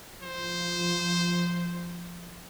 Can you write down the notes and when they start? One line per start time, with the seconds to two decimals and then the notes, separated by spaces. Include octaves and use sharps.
0.23 F3 C5